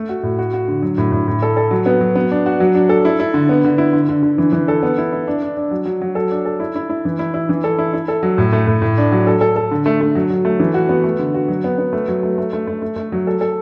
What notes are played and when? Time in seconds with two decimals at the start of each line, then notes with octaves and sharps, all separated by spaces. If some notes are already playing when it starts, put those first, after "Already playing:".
Already playing: A3
0.09 F#4
0.23 A2
0.38 F#4
0.54 F#4
0.68 D3
0.82 F#3
0.98 A2
1.12 A2
1.28 A2
1.42 A4
1.57 A4
1.71 F#3
1.86 B3
2.01 F#3
2.15 B3
2.31 D4
2.46 F#4
2.60 F#3
2.75 D4
2.89 A4
3.05 E4
3.20 E4
3.34 D3
3.49 B3
3.64 D3
3.78 E4
3.93 D3
4.09 D3
4.23 D3
4.38 E3
4.52 E3
4.68 A4
4.83 B3
4.98 E4
5.13 E4
5.27 D4
5.42 D4
5.57 D4
5.71 F#3
5.85 F#3
6.01 F#3
6.15 A4
6.31 D4
6.45 A4
6.60 E4
6.76 E4
6.89 E4
7.05 E3
7.19 E4
7.34 E4
7.49 E3
7.64 A4
7.79 E4
7.93 E4
8.08 A4
8.23 F#3
8.38 A2
8.53 A3
8.67 A2
8.82 A2
8.98 D4
9.12 F#3
9.27 A4
9.41 A4
9.56 A4
9.71 D3
9.86 A3
10.01 A3
10.15 F#3
10.30 F#3
10.45 A3
10.60 E3
10.74 F#4
10.89 B3
11.04 A3
11.19 D3
11.34 F#4
11.48 F#3
11.64 B3
11.78 B3
11.93 A3
12.08 F#3
12.23 A3
12.38 A3
12.53 A3
12.67 A3
12.82 A3
12.96 A3
13.12 F#3
13.27 A4
13.41 A4